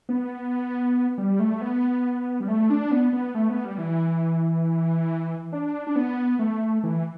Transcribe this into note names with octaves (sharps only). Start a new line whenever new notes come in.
B3
G3
A3
B3
G3
A3
D4
B3
B3
A3
B3
G3
E3
D4
D4
B3
A3
E3